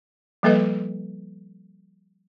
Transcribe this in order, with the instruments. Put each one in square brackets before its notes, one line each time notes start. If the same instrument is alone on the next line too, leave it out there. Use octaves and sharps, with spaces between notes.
[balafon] F3 G3 A#3 A4 B4 D#5